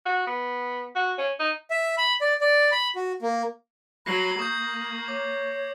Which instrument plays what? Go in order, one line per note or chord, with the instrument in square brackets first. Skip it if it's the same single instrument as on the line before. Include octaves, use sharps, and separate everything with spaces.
[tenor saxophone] F#4
B3
F#4
C#4
D#4
[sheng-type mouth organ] E5
B5
D5
D5
B5
F#4
A#3
[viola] F#3 [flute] B5 [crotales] A#6 C7 F#7
[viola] A#3 [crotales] C#6 G6 [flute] D#6
[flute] C#5 [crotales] D6